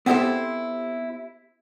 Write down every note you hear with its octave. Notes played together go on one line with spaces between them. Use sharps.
B3 C4 E4 G4 A4 C5